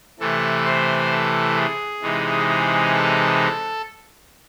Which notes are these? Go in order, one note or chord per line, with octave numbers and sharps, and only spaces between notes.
C3 E3 A3 A4
C5
A4
G#4
C3 E3 G#3 D#4
G#4
A4